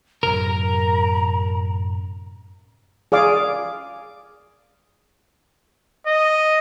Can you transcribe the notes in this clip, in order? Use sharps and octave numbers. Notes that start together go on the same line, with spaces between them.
F#2 A2 C3 A#4 A#5
G#4 D5 F5 D6
D#5